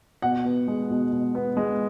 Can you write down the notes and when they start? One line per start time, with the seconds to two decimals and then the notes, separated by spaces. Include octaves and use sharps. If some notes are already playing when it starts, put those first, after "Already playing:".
0.22 B2 F#5
0.45 B3
0.68 G#3
0.90 B2
1.12 B2
1.35 B3
1.57 G#3